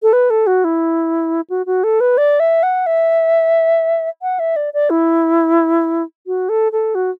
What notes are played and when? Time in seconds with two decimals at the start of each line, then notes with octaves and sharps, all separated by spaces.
0.03 A4
0.13 B4
0.30 A4
0.47 F#4
0.64 E4
1.50 F#4
1.66 F#4
1.84 A4
2.00 B4
2.18 D5
2.40 E5
2.63 F#5
2.86 E5
4.22 F#5
4.39 E5
4.56 D5
4.74 D5
4.90 E4
6.27 F#4
6.49 A4
6.72 A4
6.95 F#4